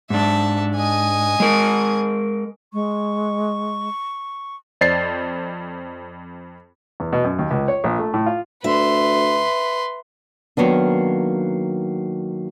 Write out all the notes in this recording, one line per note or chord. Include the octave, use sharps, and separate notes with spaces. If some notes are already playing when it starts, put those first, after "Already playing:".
G#2 D4 E5 A5
D#5 G#5
G#3 A#4
G#3 C#6
F2 C5 D5 D#5 A6 C7
E2
B2
F#2
D#2
C#2
C#5
A#1
A3
A2
F4
D2 B4 E5 C6
D#3 F#3 A#3 B3 D4